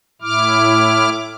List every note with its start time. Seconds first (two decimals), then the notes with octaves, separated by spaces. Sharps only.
0.22 A2 E4 D6 F6